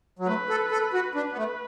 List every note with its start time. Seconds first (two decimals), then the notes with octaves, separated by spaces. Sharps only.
0.19 F#3
0.27 A3 B4
0.49 A4
0.72 A4
0.94 F#4
1.15 D4 B4
1.32 B3
1.37 A3